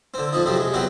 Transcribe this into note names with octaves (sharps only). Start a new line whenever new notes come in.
D3 C4
F2 F3 D#4
F2 C3 F#3 C4
G#3
E2 C3 F#3 C4 G4